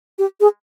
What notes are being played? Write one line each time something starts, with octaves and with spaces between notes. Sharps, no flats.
G4
G#4